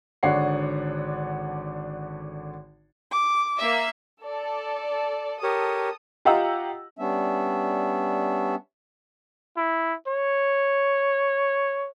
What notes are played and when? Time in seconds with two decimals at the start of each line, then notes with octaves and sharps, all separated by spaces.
0.23 G#1 D3 D4 C#5 F#5 C7
3.12 D6
3.57 A#3 E5
4.23 A4 D5
5.43 G4 A4 A#4 C#5 D#6
6.25 F4 G4 D#5 F#5 A#5 E6
6.99 G3 B3 C#4 D4 E5
9.57 E4
10.08 C#5